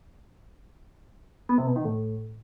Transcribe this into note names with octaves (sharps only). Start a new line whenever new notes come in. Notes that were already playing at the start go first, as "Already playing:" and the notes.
B3
C3
B2
D#3
A2